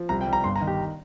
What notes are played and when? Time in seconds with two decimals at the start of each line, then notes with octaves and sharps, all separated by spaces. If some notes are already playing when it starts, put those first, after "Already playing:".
Already playing: F3
0.09 C2 A#5
0.21 G5
0.27 G3
0.33 A#5
0.44 G1 C6
0.56 A#5
0.61 D#3
0.67 G4